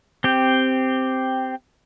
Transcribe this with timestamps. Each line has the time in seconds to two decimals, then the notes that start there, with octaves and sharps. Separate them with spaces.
0.24 C4 G4